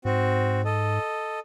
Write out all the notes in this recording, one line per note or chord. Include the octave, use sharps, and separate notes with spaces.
G#2 C4 F#4
A4 D#5